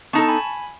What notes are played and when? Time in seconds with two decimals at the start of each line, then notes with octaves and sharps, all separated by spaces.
0.13 B3 D#4 A4 A5 C#6
0.28 G#5 B5